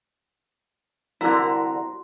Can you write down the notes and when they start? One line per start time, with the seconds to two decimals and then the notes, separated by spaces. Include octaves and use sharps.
1.21 C2 D3 E4 F#4 A#4 A#5 C6